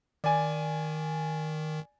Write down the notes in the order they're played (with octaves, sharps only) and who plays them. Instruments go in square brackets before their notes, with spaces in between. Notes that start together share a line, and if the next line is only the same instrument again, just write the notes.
[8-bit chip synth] D#3 [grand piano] D5 G#5